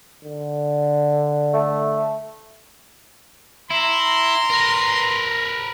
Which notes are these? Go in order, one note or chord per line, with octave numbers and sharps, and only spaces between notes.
D3
A3
E4 A#5 C6
A#4 B4